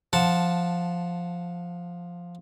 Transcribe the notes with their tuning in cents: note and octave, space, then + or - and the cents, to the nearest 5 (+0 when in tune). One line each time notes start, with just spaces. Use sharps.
F3 +0 F#5 -10 A5 +0